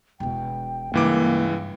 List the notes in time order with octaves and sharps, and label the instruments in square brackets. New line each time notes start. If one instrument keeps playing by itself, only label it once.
[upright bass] E1 B2 [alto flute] G5
[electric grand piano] C#2 E3 D6 [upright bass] G2 [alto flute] A#3